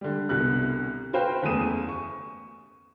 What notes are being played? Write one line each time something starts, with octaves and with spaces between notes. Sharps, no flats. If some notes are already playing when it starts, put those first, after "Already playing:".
D3 G3
C2 B2 D3 F#6
F#4 B4 C5 F5 G5
F#1 E2 A3 D#6 D#7 E7
C#6